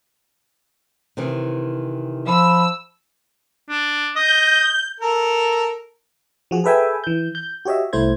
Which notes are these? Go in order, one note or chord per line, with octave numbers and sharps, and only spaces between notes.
C3 D#3 E3
F3 B5 E6
D4
D#5 G6
A4 A#4
F3 F#4 G#4
G#4 A4 B4 E5 G5 G#5
E3 G6
G6
F#4 G4 C#5 D#5 E5
C2 A3 E4 C5 G#6